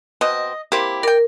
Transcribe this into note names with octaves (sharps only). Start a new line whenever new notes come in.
B2 C4 D#5
A#3 C4 E4 G4
A#4 D5 G5